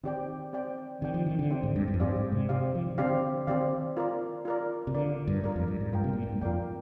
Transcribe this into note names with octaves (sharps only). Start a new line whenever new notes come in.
D#3 C4 G4 D5 G5
C4 G4 D5 G5
D#3 C4 G4 D5 G5
F3
D#3
D3
C4 G4 D5 G5
G#2
G2
G2
F2
G2 C4 G4 D5 F5
G#2
C3
C3 C4 G4 D5 F5
F3
D#3
D3 C4 G4 D5 F5
D#3 C4 G4 D5 F5
F4 A#4 D5
F4 A#4 D5
C3
D3 F4 A#4 D5
G2
G2 F4 A#4 D5
F2
G2
G#2
G2 F4 A#4 D5 G5
C3
A#2
G#2
G2
F2 F4 A#4 D5 G5